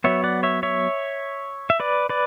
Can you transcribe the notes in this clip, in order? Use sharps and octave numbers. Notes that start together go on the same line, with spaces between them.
F#3 B3 C#5 E5
D5 F#5
C#5 E5
C#5 E5
E5
B4 D5
B4 D5